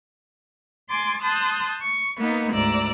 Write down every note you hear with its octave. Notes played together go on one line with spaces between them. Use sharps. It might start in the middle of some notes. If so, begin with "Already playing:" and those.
G#5 C6 D6 A6
A5 C6 D#6 F#6 G6
C#6
A#3 B3 D#4
D2 G#2 D5 A#5 E6